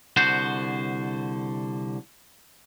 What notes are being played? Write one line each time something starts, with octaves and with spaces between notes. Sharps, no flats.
C2 D3 F#4 C5